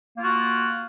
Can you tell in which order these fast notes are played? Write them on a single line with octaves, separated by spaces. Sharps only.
A#3 F4 F#4